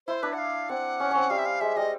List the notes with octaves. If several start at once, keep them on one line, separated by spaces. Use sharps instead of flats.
E4 C5
D4 B4
F#5
F5
C4 F#5
C#4
C4 C#4
G3 F5
E5
F5
G#3 E5
G3 D#5